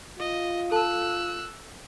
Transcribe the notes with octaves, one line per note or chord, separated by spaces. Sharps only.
F4 D#5
A4 A5 E6 F#6